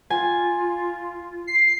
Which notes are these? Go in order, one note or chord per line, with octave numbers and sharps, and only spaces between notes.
F4 G#5
C7